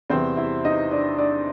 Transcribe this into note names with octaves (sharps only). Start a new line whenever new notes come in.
E2 C3 E3 G3 C4 C5
E4 E5
D#4 D#5
D4 D5
D4 D5